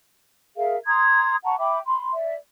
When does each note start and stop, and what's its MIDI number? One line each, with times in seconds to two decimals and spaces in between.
0.57 0.76 68
0.57 0.76 70
0.57 0.76 76
0.57 0.76 77
0.86 1.35 82
0.86 1.35 84
0.86 1.35 87
0.86 1.35 92
1.44 1.56 78
1.44 1.56 81
1.44 1.56 82
1.44 1.56 85
1.58 1.79 76
1.58 1.79 79
1.58 1.79 83
1.58 1.79 86
1.86 2.10 83
1.86 2.10 84
2.13 2.36 74
2.13 2.36 76